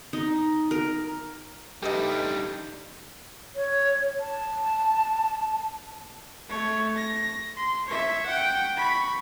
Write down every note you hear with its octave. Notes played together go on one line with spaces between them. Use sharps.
D#4
A#4
G3 A3 D4 D#4 G4 B4 D#5
C#5
A5
A3 C#5
A#6
C6
C#5 E5
F#5 G5
B5 C#6